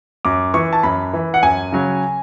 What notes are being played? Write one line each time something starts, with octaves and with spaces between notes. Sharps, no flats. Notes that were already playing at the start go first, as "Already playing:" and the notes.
F#2 D6
E3 C#6
A5
F#2 B5
E3
F#5
F#2 G#5
C#3 F#3